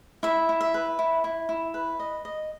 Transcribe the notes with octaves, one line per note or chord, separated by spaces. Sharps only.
E4 E5
E4
E5
B4
E4
E4
E4
B4
D#5
D#5